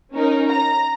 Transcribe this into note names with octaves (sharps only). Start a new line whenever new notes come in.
C#4 D#4 A#4
A#5 A#6